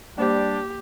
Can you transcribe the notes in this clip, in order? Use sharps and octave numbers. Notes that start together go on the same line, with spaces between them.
G3 A#3 D4 G4 C5 D5